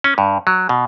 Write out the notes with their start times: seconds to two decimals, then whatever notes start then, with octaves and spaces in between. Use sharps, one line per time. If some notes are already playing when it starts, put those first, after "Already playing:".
0.04 C#4
0.18 G2
0.47 F#3
0.69 B2